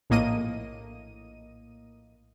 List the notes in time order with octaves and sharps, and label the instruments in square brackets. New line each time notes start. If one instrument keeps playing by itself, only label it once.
[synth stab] A#1 A2 A#3 D#5 D#7